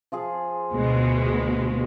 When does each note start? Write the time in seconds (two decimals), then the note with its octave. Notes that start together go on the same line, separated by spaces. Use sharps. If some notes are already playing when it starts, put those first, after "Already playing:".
0.12 F3 F4 G#4
0.73 D2 B2 G#3